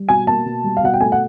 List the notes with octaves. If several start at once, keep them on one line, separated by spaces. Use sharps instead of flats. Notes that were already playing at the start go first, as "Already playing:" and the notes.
Already playing: G3
B2 G#5
A#3 A5
B2
G3
F5
B2 F#5
G5
A3 G#5
F#5